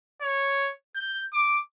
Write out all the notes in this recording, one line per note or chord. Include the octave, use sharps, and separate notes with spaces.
C#5
G6
D6